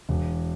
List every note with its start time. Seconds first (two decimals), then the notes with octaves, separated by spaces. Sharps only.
0.09 E1